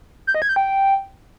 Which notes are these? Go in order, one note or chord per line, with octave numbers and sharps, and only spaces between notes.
G6
D#5
G#6
G6
G5